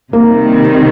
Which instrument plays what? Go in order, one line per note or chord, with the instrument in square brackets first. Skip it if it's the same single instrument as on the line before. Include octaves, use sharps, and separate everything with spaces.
[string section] C3 D#3 G3 [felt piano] A#3